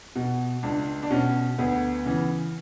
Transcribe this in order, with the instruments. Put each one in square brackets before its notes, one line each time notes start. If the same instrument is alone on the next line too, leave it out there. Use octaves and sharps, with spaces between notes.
[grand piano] B2
C#2 D4
D4
B2 C#4
D2 B3
C#3 E3